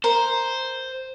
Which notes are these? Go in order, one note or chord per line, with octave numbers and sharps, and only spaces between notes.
A#4 C5